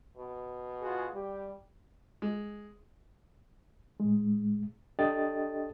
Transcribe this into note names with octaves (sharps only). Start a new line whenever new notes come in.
B2
F4 F#4 G#4
G3 G4
G#3
A2 G#3
D4 G4 A4 D#5 G5 A6